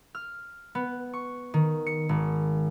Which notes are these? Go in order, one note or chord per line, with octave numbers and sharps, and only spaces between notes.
F6
B3
C#6
D#3
C#7
G#1